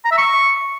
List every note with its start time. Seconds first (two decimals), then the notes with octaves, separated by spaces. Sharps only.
0.05 A#5
0.11 E5
0.18 C#6